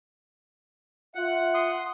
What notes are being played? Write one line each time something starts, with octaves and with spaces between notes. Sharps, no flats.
F4 E5 F#5
C6 D#6